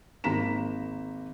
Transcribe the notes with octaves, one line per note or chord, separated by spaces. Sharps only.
G#1 A#3 A#5 B6 E7